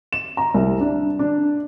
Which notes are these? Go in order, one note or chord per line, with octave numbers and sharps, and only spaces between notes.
E7
A#5
C2
D4
D4